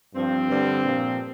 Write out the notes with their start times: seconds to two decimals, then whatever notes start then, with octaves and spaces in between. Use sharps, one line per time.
0.15 G2 F3 C4
0.49 G2 D3 G3
0.83 A#2 F3